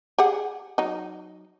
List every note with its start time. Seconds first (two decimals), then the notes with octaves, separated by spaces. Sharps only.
0.18 G4 G#4 F#5
0.78 F#3 D#4